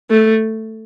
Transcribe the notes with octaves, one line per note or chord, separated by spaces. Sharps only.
A3